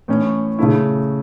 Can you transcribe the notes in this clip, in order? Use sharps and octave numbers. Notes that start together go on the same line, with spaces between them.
A2 E3 C#4
C#3 A3 E4